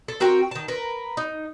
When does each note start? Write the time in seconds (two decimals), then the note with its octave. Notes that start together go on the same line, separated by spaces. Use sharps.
0.08 A4
0.20 C4 F#4 A#4 G5
0.51 D#3 A5
0.68 A#4 B4
1.17 D#4